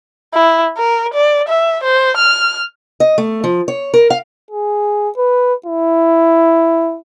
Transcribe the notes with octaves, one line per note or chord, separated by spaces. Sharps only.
E4
A#4
D5
E5
C5
F6
D#5
A3
F3
C#5
A#4
F5
G#4
B4
E4